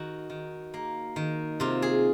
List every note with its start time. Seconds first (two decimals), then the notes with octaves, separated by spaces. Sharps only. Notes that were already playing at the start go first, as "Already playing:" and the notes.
Already playing: D#3 F#4
0.30 D#3
0.74 A#3
1.16 D#3
1.60 C3 F4
1.82 G#4